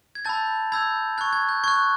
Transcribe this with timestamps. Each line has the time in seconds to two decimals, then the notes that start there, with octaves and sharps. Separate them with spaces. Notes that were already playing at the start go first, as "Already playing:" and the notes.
0.15 G#6
0.25 A5 B5 E6 G6 A6
0.72 B5 E6 G6 G#6
1.18 C#6 F#6 G#6
1.33 G#6
1.49 G6
1.64 C#6 F#6 G#6